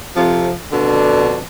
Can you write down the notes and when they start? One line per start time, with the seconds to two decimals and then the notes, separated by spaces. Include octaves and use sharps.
0.15 F2 C3 F3
0.71 F2 B2 D3 D4